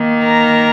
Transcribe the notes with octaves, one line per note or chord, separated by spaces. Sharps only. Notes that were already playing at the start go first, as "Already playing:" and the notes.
Already playing: D#3 A#3
A#4 A#5